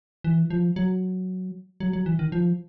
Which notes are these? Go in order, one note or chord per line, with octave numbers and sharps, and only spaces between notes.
E3
F3
F#3
F#3
F#3
E3
D#3
F3